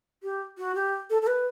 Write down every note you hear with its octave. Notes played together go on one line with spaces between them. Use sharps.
G4
F#4
G4
A4
A4
B4